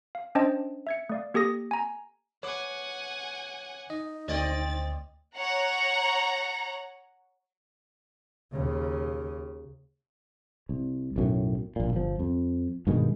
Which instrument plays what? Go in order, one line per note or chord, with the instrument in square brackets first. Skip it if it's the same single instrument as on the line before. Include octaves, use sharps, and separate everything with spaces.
[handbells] F5
C#4 D4 C5 D#5 G5 A5
E5 G#6 C#7
A3 D5 F5
A#3 G4 A4 D#6 A#6
G#5 A#5
[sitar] B4 [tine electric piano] C#5 D6 [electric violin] F#5 G#5
[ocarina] D#4 [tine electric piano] D#5
[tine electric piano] D2 [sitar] C4 D5 D#5 [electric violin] A6
[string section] C#5 F#5 A#5
[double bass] D#2 C#3
[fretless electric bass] C2
B1 F#2 A2
A#1 A#2
G1 F3
F2
G2 B2 D#3 G#3